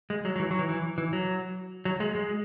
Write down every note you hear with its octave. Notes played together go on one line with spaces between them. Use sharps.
G#3
F#3
F#3
E3
F#3
E3
E3
E3
F#3
F#3
G#3
G#3